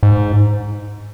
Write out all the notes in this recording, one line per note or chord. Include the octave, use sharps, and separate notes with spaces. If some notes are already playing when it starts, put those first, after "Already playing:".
G#2